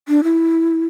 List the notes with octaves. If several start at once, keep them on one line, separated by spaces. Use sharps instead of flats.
D4
E4